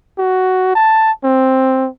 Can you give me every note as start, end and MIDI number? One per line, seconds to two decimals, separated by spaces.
0.18 0.72 66
0.75 1.12 81
1.24 1.89 60